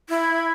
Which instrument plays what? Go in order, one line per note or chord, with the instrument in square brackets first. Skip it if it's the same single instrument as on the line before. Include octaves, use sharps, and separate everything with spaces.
[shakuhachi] E4